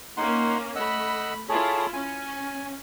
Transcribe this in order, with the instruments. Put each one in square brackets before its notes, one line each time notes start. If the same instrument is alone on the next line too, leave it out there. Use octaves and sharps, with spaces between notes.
[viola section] A#3 C#4 [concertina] D#4 F#5 C6
[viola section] A3 B5 [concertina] D#5 F#5 E6
[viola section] E4 F4 [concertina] G#4 A4 C#5
[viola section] C#4 [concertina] G#5